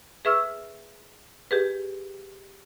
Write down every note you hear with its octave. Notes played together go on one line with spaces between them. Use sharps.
G#4 B4 E5 C#6 E6 F6
G4 G#4 B4